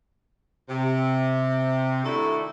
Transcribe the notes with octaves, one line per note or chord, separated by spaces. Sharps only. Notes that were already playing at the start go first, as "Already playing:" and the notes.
C3
D#3 A3 D4 E4 F#4 A4